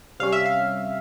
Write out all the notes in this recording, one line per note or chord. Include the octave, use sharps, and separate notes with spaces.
C3 G3 C#4 F5
E5
F5